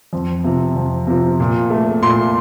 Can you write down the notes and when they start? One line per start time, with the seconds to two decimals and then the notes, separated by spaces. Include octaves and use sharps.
0.13 F2
0.44 C3 F3
0.76 F2
1.07 C3 F3
1.40 A#2
1.70 A3
2.02 A#2 C6